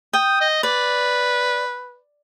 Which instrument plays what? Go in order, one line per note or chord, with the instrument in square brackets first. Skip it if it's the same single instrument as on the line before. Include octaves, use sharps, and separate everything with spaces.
[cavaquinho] G5 [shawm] D#6
[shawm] D#5
[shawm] B4 [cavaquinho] D5